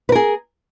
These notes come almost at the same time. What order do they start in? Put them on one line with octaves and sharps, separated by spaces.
B4 A#4 G#4